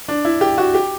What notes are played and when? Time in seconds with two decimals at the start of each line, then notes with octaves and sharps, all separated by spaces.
0.08 D4
0.25 E4
0.41 G4
0.58 F#4
0.74 G4